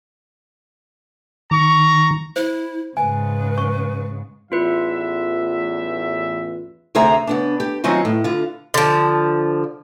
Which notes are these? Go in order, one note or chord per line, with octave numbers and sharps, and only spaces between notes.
D#3 A#5 C#6
E4 C5
G#2 C#3 B4 G#5
C#6
A1 E2 F4 B4 E5
D2 C3 G#4 C5 E5 A#5
C#3 B3 D4
G4
D#3 F#3 C4 C#4 D#4 F4
A2
D3 F4
D3 F3